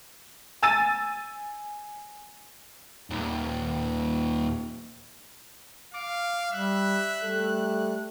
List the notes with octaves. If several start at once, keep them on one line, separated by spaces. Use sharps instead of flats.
G#5 E6 A6 D#7
D#2 A#2
F5 D6
G3 E5 F#6
G3 A3 A4